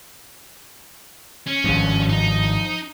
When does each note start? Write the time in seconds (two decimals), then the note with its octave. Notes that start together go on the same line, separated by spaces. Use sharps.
1.47 C#4
1.64 G#1 G2 F3
2.09 D#4